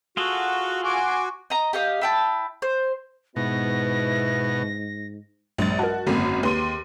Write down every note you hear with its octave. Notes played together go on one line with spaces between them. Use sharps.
F4 F#4 G#4 A4
F#4 G#5 C6 D6
D#5 A#5
G4 D#5 F5
E4 G5 A5
C5
G#2 B2 B3 E4 A#6
A#1 G2 F#3 G#3 A6
F#4 A#4 D#5 A5
G#1 F#2 D3 A#3 C4
D#2 G#4 B4 C6 D#7